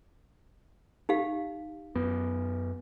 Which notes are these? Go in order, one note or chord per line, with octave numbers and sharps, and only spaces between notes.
D#4 G4 F5
F#2 B3